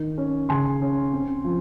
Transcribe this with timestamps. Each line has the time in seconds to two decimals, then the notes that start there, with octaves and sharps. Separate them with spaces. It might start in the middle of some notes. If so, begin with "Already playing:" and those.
Already playing: D#3
0.18 C#4
0.49 C#3 G#5 C6
0.81 C#4
1.13 C4
1.44 F3